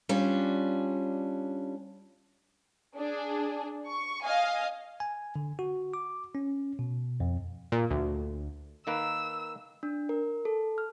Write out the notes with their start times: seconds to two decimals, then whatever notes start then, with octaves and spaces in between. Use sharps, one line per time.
0.09 G3 C#4 D4 F4
2.97 D4 G#4
3.87 C#6
4.23 D#5 F5 G#5
5.00 G#5
5.36 D3
5.59 F#4
5.94 D6
6.35 C#4
6.79 B2
7.20 F2
7.72 A#2
7.90 D2
8.87 D#3 A#3 B4 E6
9.83 D4
10.09 A#4
10.45 A4
10.78 F6